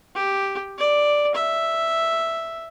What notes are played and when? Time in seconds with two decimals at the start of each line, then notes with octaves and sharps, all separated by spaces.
0.15 G4
0.79 D5
1.35 E5